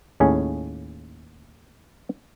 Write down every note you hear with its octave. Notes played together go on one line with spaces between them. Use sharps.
D#2 A2 C#4 G#4